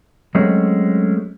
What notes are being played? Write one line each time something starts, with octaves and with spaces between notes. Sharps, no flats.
F#3 G#3 A3 C4 C#4